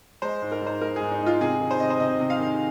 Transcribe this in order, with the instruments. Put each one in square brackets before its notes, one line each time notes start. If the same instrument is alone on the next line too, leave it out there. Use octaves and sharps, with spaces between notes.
[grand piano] G#3 C5
G#2
A#4
G#2
C5
G#3 A#4
G#4
G#2
D#4
G#3
F4
C3 G#4
D#3
C5
C3 D#5
C5
C3 D#5
C3
F5
D#3